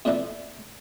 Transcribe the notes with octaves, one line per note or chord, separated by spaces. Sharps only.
F2 A#2 E3 D4 E4 A4